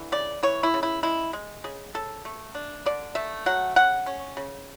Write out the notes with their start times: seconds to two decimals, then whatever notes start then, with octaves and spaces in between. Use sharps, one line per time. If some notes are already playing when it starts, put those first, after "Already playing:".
Already playing: D3 E3
0.12 C#3 D5
0.43 E3 C#5
0.63 E4
0.74 C#3
0.83 E4
1.03 G#3 E4
1.33 G#3
1.64 C#3 G#4
1.94 C#3 A4
2.25 A3
2.55 D4
2.86 D3 D5
3.15 A3 E5
3.46 F#3 F#5
3.76 C#3 F#5
4.06 C#4
4.37 C#3